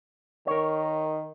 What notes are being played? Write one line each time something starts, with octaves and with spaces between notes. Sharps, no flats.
D#3 A#4 C#5